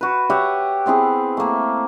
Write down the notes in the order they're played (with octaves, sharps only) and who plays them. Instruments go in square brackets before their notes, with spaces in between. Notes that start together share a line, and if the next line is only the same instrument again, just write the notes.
[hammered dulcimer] F#4 B4
G4 C#5 E5 F#5
B3 C4 E4 G#4
A3 A#3